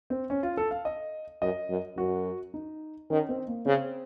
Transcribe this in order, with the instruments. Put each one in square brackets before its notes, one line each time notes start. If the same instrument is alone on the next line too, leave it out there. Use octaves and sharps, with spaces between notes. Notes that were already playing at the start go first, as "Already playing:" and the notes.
[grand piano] C4
C#4
F4
A4
F5
D#5
[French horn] F#2 [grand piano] D#5
[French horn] F#2
[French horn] F#2 [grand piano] F#4
[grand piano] D#4
[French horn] D#3 [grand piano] C#4
[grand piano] C4
A#3
[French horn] C#3 [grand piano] C4